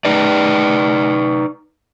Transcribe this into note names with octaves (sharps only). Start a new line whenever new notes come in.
D#4 B4 D5